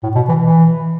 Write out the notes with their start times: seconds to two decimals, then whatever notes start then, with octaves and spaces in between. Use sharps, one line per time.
0.03 A2
0.15 B2
0.29 E3
0.41 E3